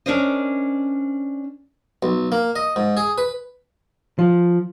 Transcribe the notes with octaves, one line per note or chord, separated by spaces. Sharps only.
C#4 D4 A#4 C5 D#5
B1
A#3
D#5
G#2
G#4
B4
F3